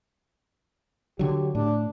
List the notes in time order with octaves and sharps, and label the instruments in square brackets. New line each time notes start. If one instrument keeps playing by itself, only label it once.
[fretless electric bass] D3 F#3 [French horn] G4
[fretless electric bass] A2 [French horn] D4